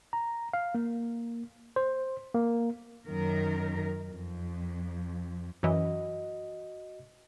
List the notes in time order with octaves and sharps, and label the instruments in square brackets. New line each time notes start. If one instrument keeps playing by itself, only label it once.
[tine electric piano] A#5
F5
A#3
C5
A#3
[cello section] F#2 D#3 A#4
F2
[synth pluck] F#2 E3 [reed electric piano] F#4 D#5